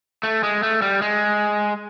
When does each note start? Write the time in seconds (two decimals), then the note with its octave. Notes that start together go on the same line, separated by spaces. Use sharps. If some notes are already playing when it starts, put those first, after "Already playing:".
0.23 A3
0.43 G#3
0.63 A3
0.82 G3
1.02 G#3